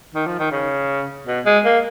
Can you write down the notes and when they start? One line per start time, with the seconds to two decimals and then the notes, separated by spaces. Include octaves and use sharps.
0.14 D#3
0.27 F3
0.39 D#3
0.51 C#3
1.27 B2
1.45 G#3
1.65 A#3